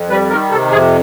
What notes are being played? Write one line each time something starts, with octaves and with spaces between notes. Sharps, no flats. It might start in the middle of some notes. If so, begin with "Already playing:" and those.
Already playing: F2
G3 B4
D#3 A#4
C3 A4
F2 G#4